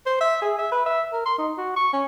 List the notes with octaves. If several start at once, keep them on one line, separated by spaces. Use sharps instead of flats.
C5
E5
G#4
E5
B4
E5
A#4
C6
D#4
F#4
C#6
C#4